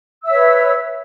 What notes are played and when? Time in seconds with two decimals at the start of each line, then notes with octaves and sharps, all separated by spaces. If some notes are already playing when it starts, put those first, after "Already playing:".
0.22 E6
0.25 E5
0.29 C#5
0.32 B4